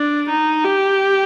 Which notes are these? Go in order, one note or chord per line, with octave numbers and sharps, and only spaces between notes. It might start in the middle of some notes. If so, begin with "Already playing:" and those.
Already playing: D4
D#4
G4